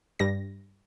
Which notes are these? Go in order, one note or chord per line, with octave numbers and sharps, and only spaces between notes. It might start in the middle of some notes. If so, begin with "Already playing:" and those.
G2 G3 A#6